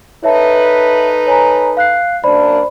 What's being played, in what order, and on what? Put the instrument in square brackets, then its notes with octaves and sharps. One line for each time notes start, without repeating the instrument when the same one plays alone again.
[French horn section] D#4 A4 B4 [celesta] C#5 E5 A5
[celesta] C#5 G#5 A#5
F5 F#6 C7
[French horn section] F#2 A#3 D4 [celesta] C5 D5 B5